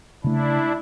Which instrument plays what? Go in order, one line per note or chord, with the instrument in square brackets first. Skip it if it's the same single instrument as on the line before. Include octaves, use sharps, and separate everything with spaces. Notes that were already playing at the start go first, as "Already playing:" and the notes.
[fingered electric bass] C#3 A3 [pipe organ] D4 E4